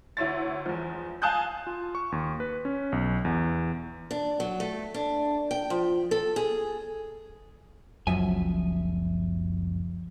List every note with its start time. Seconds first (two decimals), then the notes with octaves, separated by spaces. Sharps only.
0.17 D2 E4 C#5 A6
0.66 E2 F3
1.22 F5 G#5 A5 D#6 F#6 G6
1.67 F4
1.95 C#6
2.12 D#2
2.40 B4
2.65 C#4
2.92 B1
3.25 E2
4.11 D4
4.40 F#3
4.60 A3
4.94 D4
5.51 G5
5.70 F3
6.11 A4
6.36 G#4
8.07 F#1 C#2 F#2 F3 E5 G#5